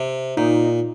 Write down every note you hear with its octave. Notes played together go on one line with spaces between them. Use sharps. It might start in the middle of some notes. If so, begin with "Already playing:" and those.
Already playing: C3
A#2 D#4